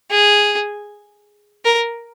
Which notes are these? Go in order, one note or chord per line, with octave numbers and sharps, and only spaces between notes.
G#4
A#4